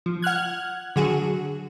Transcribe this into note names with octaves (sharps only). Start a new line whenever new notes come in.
F3
F#5 F6 F#6 G#6
D3 F#3 F#4 G#4